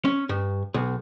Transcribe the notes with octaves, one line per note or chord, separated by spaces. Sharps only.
C#4
G2
B1